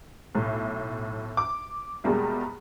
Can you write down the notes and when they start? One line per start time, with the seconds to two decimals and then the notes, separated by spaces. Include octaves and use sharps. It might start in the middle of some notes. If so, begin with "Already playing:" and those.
0.35 B1 A2
1.37 D6
2.04 E2 B2 G3 G#3 A#3